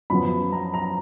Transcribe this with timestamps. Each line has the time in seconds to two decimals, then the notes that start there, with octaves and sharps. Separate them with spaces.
0.10 F#2 F3 B3 B5
0.52 A#5
0.74 A#5